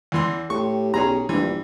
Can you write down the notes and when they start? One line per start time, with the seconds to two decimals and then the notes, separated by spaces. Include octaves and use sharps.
0.12 E2 E3 C6
0.50 A2 G4 C#6
0.94 B1 C#4 G#4 A#5
1.29 A#1 G2 E3